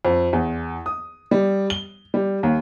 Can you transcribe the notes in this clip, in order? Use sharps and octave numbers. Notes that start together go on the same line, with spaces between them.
F2
E2
D#6
G3
G7
G3
D#2